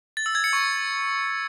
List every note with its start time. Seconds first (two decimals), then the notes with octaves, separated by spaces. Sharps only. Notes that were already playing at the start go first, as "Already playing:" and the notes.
0.17 A6
0.26 E6
0.35 G#6
0.44 C#7
0.53 C#6